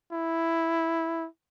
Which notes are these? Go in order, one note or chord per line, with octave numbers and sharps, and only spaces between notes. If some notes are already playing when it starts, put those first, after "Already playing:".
E4